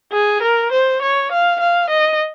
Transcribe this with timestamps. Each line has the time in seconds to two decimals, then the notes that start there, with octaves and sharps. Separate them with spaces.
0.12 G#4
0.42 A#4
0.72 C5
1.02 C#5
1.32 F5
1.60 F5
1.90 D#5